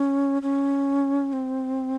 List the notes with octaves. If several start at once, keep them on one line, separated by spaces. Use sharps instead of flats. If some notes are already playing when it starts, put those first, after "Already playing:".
Already playing: C#4
C#4
C4